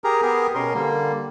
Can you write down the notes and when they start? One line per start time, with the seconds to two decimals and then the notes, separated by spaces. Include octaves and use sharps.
0.04 G4 G#4 A#4 A#5
0.22 B3 G4 G#4 A#4
0.55 B2 C#4 A#4 C6
0.74 D3 G3 A#3